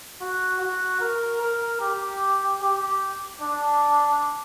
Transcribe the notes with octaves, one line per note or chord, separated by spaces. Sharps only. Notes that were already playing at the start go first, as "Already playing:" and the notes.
F#4
F#4
A#4
A#4
G4
G4
D4